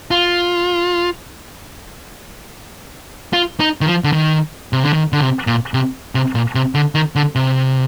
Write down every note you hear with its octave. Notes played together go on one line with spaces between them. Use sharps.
F4
F4
D#4
D#3
F3
D3
D#3
C3
D3
D#3
D3
C3
A#2
C3
C3
A#2
C3
D3
D#3
D3
C3